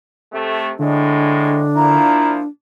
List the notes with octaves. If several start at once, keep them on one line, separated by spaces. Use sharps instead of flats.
C3 A3
A2 D3 G#3 D4
A#2 F3 E4 A#5